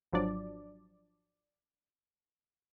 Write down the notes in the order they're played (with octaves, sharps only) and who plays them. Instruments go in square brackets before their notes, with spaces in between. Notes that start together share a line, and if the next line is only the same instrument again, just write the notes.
[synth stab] G#1 F3 F#3 D4 D5